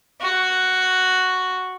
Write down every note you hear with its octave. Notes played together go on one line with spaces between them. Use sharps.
F#4